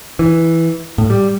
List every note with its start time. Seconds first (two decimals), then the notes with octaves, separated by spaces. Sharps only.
0.19 E3
0.98 A2
1.10 G3